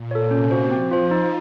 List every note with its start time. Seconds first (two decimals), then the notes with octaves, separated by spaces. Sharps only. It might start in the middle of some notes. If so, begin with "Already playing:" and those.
Already playing: A#2
0.11 A4 C#5
0.31 C3 C#4
0.51 F#4 C5
0.71 F3 C4
0.91 F4 C5
1.11 D#4